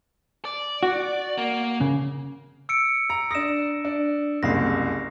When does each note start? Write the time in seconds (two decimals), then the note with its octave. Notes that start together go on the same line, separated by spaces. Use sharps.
0.45 D5
0.83 F#4
1.38 A#3
1.81 C#3
2.69 E6 C#7 D7
3.10 A#5
3.31 D4 D#6 A#6 E7
3.85 D4
4.43 F#1 C2 A#6 C7